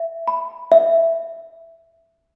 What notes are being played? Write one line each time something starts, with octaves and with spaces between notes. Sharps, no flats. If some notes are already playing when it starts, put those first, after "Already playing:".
Already playing: E5
B5
E5